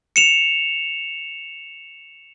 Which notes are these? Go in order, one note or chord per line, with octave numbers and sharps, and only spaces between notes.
C#7 E7 F7